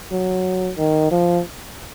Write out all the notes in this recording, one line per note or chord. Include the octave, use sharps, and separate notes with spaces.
F#3
D#3
F3